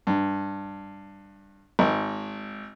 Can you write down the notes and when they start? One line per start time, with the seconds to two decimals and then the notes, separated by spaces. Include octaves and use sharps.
0.07 G2
1.79 G#1